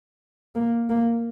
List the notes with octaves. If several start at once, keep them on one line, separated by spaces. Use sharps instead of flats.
A#3
A#3